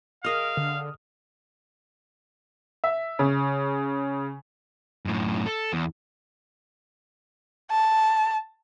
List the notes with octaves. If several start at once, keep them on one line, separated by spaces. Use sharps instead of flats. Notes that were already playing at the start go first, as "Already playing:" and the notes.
G#4 A#4 D#5 F5 D#6 F6
D3
E5
C#3
F#2 A2
A4
E2
A5